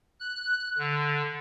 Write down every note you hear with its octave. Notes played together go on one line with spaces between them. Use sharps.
F#6
D3